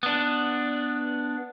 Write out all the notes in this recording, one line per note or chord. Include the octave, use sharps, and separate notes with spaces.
B3 D4